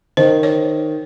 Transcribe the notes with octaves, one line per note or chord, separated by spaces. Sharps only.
D#3 C5
C#5